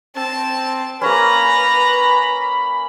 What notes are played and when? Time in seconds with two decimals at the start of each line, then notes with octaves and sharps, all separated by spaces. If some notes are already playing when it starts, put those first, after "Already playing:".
0.16 C4 A5
1.02 A#3 C#4 B4 A#5 B5